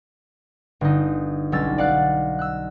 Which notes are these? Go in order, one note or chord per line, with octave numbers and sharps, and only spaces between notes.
G1 D#4
B1 G3 C#4 E6 A6
D5 F5 F#5 F#6
E6 F#6